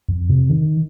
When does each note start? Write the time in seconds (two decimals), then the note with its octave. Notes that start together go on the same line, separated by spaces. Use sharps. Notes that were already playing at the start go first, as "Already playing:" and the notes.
0.09 F2
0.30 C3
0.49 D#3